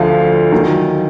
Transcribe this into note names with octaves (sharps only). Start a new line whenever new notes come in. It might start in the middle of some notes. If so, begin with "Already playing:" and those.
Already playing: D2 D3 F3 F5
D#3 F#3